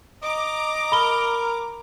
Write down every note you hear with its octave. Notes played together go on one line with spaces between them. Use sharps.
D#5 A#5 D6
A#4 B5 G7